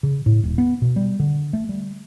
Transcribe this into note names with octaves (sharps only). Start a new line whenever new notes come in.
C#3
A2
D#1
B3
B2
G3
D3
A3
G3